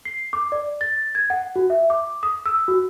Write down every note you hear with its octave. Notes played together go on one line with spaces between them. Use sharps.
C7
D6
D5
A6
G#6
F#5
F#4
E5
D6
D#6
E6
F#4